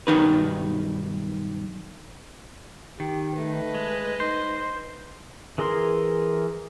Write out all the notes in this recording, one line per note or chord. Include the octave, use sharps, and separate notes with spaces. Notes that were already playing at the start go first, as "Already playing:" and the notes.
B1 G2 D#3 D#4 B4
D#3 G4
A3 B4 D#5
G#3
D#4 C5
E3 G#4 A#4 C6